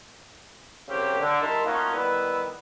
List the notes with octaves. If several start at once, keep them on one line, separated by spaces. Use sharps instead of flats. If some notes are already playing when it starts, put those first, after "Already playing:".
C2 C#3 F#3 A#3 C4 G4
D3
G3 D#4 E4 A#4 A5 C6
A3 A#3 C#4 D#4 F4 F#4
D#3 G3 B3 E4 B4